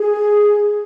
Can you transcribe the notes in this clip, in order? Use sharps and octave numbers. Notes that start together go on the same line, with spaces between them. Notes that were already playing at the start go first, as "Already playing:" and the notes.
Already playing: G#4